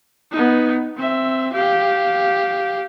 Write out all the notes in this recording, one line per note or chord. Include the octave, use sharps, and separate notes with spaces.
B3 D#4
C4 E5
G4 F5